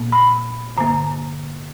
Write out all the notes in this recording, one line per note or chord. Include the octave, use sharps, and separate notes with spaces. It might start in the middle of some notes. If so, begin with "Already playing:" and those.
Already playing: A#2 A#3
B5
G2 D3 A#3 A#5